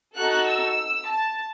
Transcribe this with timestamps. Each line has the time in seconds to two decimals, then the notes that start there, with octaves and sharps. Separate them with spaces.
0.16 D#4 F#4 A4 F#6
0.47 E6
1.08 A5